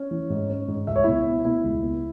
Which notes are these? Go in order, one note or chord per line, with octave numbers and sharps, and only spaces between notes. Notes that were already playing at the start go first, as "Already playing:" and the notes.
Already playing: C#4 C#5
E3
G#2
C#4
G#2
C#2 E5
C#5
B2 E4 E5
B3
B2 E4 E5
C#2
B3